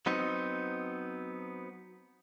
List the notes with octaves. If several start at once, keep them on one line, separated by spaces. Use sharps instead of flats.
F#3 B3 C4 D#4